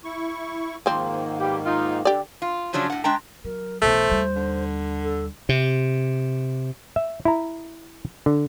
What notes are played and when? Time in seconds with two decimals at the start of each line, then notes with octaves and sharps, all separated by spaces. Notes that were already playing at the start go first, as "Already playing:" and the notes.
0.04 E4 C#6
0.86 G#2 D#3 F3 A#3 C4
1.40 G3 B3 G4
1.65 D#4 F4
2.05 D3 G4 D5
2.42 F4
2.73 C#3 F3 F#3 C#4 D4
2.90 A2 F#5
3.04 G#3 D4 G5 A#5
3.45 F#3 A#4
3.82 B1 E2 A3 C5
4.12 D#2 G3
4.36 D3
5.03 A4
5.49 C3
6.96 E5
7.25 E4 A#5
8.26 D3